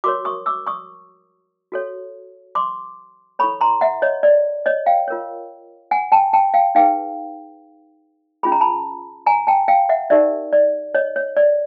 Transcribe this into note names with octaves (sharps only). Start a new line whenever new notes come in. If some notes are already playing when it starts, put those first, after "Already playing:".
F#4 A#4 C#5 C6 D6
C#6 D#6
D6 E6
C#6 D#6
F#4 A4 C#5
C6 D6
E4 A4 C#5 B5 C#6
A#5 C6
E5 F#5
C#5 D#5
D5
C#5 D#5
F5 G5
F4 A#4 C#5
F#5 G#5
G5 A5
G5 A5
F5 G5
D#4 G#4 B4 F5 G5
C#4 F4 G#4 B5
A#5
A5 B5
G#5 A#5
G5 A5
F5 G5
E5 F#5
D#4 G4 A#4 D5 E5
D5
C#5 D#5
C#5
D5